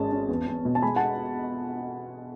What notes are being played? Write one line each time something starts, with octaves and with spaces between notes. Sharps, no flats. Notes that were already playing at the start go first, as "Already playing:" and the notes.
Already playing: G#1 G#3 C#4 A5
C#4
E2
E2
B2
A5
G#3 G#5 B5
F#5 A5